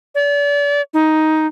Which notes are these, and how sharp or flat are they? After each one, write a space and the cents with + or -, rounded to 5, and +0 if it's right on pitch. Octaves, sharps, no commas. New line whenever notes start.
D5 -35
D#4 +10